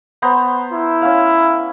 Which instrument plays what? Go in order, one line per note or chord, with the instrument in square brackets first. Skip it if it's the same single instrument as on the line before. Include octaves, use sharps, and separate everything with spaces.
[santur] B3 C5 A#5
[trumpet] E4
[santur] C#4 F5